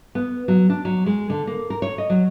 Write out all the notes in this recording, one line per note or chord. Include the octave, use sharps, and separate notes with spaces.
B3
F#3
D4
F#3
G#3
D3
A#3
A#4
C#5
D#5
F#3